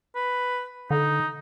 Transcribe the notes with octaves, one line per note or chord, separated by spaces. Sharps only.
B4
D3 D#4